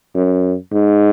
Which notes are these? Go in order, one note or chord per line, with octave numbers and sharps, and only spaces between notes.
F#2
G#2